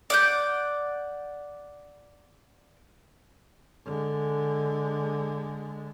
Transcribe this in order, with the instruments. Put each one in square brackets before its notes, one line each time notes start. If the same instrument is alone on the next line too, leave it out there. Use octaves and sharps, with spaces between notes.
[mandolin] D5 F#5 G6
[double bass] D3 G#3